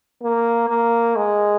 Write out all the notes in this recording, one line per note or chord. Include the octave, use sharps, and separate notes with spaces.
A#3
A#3
G#3